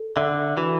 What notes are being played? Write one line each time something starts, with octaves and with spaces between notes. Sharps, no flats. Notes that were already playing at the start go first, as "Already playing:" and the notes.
Already playing: A4
D3 E5
E3 F#4